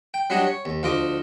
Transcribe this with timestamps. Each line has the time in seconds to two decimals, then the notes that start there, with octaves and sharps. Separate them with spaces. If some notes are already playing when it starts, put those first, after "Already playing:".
0.14 G5
0.30 F#3 G3 D4 F#4 C#5 D#5
0.47 C#5
0.65 D#2
0.83 D2 F3 F4 D#5 D6